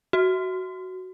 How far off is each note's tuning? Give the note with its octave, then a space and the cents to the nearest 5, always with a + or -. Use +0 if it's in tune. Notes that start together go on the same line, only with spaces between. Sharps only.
F#4 +10